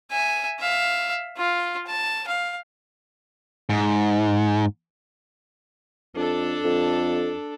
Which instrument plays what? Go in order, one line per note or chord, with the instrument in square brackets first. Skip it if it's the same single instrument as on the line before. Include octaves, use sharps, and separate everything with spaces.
[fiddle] E5 G#5
E5 F5
F4 F5
A5
F5
[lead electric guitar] G#2
[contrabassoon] F2 [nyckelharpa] D4 A4
[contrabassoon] F2